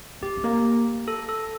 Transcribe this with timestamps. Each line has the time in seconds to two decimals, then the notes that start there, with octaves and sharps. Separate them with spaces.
0.22 A3 G4
0.37 A3
0.44 A#3
1.08 A4
1.29 A4